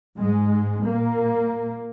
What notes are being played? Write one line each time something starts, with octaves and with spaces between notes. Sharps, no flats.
G#2 G#3
A#2 A#3